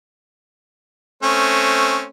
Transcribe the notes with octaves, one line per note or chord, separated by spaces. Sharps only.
A3 C4 C#4